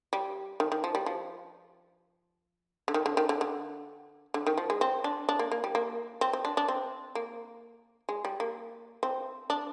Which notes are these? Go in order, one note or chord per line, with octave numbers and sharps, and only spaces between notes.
G3
D#3
D#3
F3
G3
F3
D3
D#3
D3
D#3
D3
D3
D3
D#3
F3
G#3
C4
D4
D4
A#3
A#3
G3
A#3
C4
C4
D4
D4
C4
A#3
G#3
G3
A#3
C4
D4